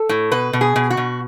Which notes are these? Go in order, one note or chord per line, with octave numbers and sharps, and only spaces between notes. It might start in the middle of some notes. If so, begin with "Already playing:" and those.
Already playing: A4
A2
B2 B4
B2
G#4
B2
F#4
B2